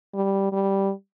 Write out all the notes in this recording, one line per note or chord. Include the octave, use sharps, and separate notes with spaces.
G3
G3